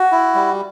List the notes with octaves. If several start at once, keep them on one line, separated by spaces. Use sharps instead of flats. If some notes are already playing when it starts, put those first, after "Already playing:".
Already playing: F#4
E4
G3